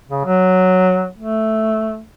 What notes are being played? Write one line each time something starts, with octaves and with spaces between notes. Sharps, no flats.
C#3
F#3
A3